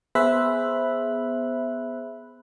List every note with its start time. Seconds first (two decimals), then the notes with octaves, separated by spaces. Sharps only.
0.15 B3 G#4 C5 E5 B5 F#6